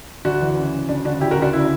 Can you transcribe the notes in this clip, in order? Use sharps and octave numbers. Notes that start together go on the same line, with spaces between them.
D2 D4 F#4
E3
C#3
C#3
D2 D4
C#3 D4 F#4
D2 E4 G4
F#4 A#4
D2
D4 F#4
C#3 E4